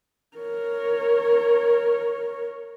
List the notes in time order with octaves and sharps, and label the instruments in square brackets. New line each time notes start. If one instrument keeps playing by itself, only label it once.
[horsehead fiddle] A#4 C#5